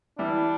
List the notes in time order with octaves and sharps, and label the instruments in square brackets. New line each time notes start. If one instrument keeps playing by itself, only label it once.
[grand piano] E3 G3 E4 [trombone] D4